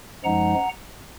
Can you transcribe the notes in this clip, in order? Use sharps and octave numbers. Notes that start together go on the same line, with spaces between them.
F#2 F3 G#3 D#4 F#5 A#5